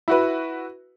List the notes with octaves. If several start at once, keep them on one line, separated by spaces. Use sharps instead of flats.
E4 F#4 B4